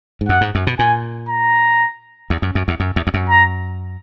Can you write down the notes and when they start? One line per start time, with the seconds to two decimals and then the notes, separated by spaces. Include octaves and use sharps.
0.21 G#2
0.29 F#2 F#5
0.41 G#2
0.55 F#2
0.67 B2
0.79 A#2 G#5
1.29 A#5
2.30 E2
2.42 F#2
2.55 F#2
2.68 E2
2.80 F#2
2.96 E2
3.07 E2
3.14 F#2
3.30 A#5